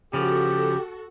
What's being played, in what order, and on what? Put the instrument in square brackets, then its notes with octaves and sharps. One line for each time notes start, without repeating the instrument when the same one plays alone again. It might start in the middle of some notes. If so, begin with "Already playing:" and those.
[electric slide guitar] C#3 F3 [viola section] F#4 A4 [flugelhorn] G4